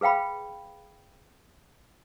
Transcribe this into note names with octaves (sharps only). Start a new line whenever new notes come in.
G#4 B4 F5 G5 B5